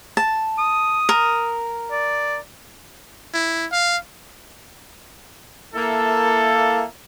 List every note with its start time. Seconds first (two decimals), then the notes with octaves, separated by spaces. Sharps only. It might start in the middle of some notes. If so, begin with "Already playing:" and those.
0.17 A5
0.59 D#6
1.09 A#4
1.91 D5
3.34 E4
3.72 F5
5.75 A#3 E4 A4